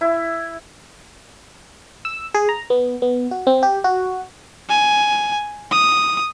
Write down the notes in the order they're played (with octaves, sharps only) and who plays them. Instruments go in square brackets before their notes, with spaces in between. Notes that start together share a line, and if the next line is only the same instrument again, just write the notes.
[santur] E4
[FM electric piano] E6
G#4
A#5
B3
B3
F#4
C4
G4
F#4
[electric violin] G#5
D#6